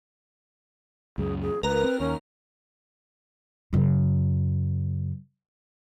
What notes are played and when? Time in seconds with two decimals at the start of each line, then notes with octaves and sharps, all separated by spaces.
1.18 C#2 F#2 G#4
1.41 G#4
1.63 C#2 A#4 B4 A#5
1.84 C4
2.00 D#2 C#4
3.73 F#2 C#3